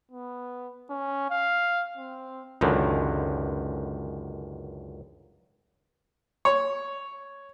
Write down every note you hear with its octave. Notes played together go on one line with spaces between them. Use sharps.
B3
C#4
F5
C4
C#2 F#2 D3 D#3
C#5